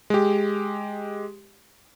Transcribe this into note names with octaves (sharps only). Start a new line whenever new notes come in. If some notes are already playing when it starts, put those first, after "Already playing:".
G#3 G4